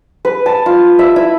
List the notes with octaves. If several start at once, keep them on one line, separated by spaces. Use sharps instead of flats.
B4
A5
F4
E5
E4